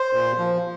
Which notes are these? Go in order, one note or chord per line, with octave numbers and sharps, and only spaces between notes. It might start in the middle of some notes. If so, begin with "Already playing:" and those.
Already playing: C5
A#2
F3